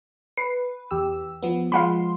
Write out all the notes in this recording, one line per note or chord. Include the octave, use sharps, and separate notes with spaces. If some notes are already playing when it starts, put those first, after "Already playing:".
B4 C7
E2 G4 E6
F3 B3
F3 G#3 F5 F#5 B5 C6